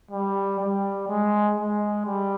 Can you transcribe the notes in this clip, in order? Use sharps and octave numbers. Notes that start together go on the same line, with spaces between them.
G3
G3
G#3
G#3
G3